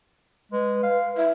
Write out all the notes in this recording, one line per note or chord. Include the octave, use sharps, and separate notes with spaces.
G#3 B4
F5
E4 E5